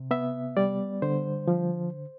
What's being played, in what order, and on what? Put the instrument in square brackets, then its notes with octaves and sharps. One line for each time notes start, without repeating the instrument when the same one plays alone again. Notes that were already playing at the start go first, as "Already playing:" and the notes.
Already playing: [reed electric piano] C3
B3 E5
G3 D5
D3 C5
F3